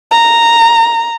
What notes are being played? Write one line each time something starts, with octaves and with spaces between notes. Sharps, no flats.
A#5